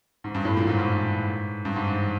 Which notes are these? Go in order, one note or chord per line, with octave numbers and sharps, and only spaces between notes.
G#2
G2
A2
A#2
G#2
G#2
G2
G#2
G#2